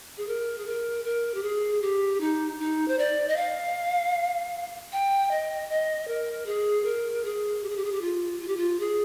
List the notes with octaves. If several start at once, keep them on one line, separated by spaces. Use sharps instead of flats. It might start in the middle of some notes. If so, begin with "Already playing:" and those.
G#4
A#4
G#4
A#4
A#4
G4
G#4
G4
D#4
D#4
C5
D5
D#5
F5
G5
D#5
D#5
A#4
G#4
A#4
G#4
G4
G#4
G4
G#4
G4
F4
F4
G4
F4
G#4